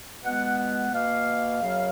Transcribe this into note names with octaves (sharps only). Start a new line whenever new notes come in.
B2 G#3 B3 F#5
F#5
B2 A#3 F5
F#2 C#3 F#3